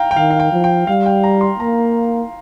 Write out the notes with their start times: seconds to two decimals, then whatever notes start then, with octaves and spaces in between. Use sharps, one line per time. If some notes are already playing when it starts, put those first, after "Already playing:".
Already playing: F5 G5 A#5
0.11 G5
0.16 D#3 F5
0.31 F5
0.40 G5
0.52 F3
0.64 G5
0.87 G3 F5
1.06 G5
1.24 A#5
1.41 C6
1.59 A#3 A#5